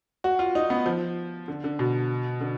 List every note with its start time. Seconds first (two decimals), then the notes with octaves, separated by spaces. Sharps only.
0.24 F#4
0.39 F4
0.55 D#4
0.70 B3
0.86 F3
1.48 D3
1.64 D3
1.79 B2
2.41 D3